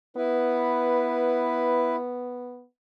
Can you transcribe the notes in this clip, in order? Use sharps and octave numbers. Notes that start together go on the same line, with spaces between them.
B3 E4 B4